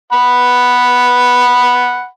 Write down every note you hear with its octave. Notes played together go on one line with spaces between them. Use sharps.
F#5 B5